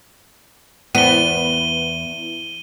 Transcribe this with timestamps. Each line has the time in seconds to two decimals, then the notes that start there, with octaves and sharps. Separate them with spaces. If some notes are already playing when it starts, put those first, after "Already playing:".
0.95 E2 B3 D#7 G7